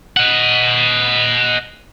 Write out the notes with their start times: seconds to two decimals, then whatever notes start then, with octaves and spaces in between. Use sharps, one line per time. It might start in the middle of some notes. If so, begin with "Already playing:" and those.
0.17 D#5 F#5